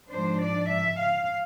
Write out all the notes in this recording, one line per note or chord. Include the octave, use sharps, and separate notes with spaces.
G#2 F3 G#3 D4 C5
D5
E5
F5